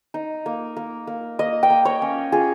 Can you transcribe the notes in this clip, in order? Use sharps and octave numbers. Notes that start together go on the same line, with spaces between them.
D#4
A#3
A#3
A#3
A#3 D#5
G5
A#3
C#5
C#4
F4 G#4